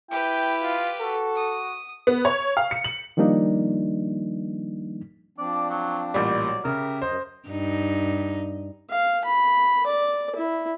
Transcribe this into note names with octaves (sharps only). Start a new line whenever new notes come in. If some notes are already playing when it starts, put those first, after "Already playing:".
E4 G4 B4 G5
F4
F#4 A4
D#6
B3
C#5
F5
C#7
F#7
D#3 F3 G3 A#3 D4 D#4
F3 C4 D4 D5
F#3
A1 A#2 G3 D5
F#3
C#3 G4 A#4 E5
F#2 C5 D#5
G2 D#4
F5
B5
D5
E4